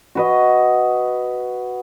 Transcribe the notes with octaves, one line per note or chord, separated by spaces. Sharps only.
F#4 B4 D#5